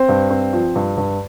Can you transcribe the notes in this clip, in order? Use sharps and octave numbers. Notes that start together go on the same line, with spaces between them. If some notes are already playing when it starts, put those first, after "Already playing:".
Already playing: C4 C5
G2
C4
F3
G2
G2